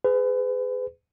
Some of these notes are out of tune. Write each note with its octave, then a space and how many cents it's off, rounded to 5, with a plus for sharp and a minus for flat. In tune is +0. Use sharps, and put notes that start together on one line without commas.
G#4 +0 B4 +35